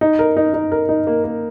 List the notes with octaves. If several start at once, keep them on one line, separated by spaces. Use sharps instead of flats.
D#4
A#4
D#4
D#4
A#4
D#4
A#3
A#3